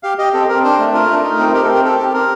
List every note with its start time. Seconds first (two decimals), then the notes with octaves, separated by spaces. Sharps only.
0.03 G4 F5
0.18 G4 D#5
0.34 C4 A4
0.49 C4 A#4
0.64 D4 C5
0.79 A3
0.94 F4 A#4
1.09 A3
1.24 D#4 A#4
1.39 C4
1.54 G4 A#4
1.64 A4
1.69 C4
1.74 A#4
1.84 G4 A4
1.99 G4
2.14 C4 A#4